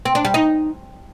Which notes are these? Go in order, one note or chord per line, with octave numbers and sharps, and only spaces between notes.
C4
D4
G3
D#4